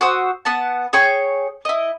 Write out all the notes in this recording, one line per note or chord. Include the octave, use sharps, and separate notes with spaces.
F#4 C5 D#6 E6
B3 F#5 A5
G#4 C#5 G5 C#6
E4 D#5